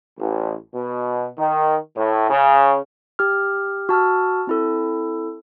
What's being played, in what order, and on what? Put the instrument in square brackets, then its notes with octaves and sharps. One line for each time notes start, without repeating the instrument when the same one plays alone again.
[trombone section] A1
B2
D#3
A2
C#3
[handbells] G4 F6
F#4 A5 E6 F6
C4 E4 A4